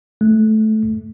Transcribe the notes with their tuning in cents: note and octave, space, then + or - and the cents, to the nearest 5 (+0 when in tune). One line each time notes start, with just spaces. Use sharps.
A3 -15